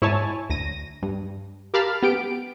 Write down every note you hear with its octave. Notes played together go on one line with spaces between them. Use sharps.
G#2 E4 C#5 G#5 A5
D2 A#6 D#7
G2
G4 A#4 F5 A5 B5 F6
B3 G4 D7